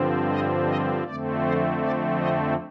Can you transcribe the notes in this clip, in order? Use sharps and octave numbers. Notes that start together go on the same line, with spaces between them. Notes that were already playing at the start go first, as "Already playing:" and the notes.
Already playing: G2 D3 F3 C4
D#5
D#5
F2 D3 A3 C4 D5
C5
D5
D#5